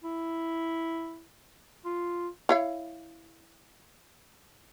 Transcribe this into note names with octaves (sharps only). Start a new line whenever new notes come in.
E4
F4
E4 C#5 F5